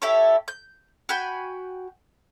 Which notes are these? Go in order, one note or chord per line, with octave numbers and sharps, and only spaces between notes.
E4 G4 A4 C#5
G6
F#4 G5 G#5 B5